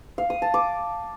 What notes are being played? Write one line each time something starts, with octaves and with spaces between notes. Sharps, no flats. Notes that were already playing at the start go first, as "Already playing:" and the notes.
F5
D#6
A5
D6